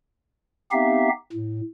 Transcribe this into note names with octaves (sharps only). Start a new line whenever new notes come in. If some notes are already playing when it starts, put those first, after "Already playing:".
B3 C4 D#4 G4 E5 F5
A2